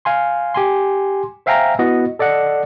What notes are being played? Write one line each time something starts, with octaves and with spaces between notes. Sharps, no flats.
F5 G#5 C6
G4 G#5 C6
C5 E5 F5 G5 G#5 A#5
B3 E4 F#4 D#5
A4 D5 D#5 F#5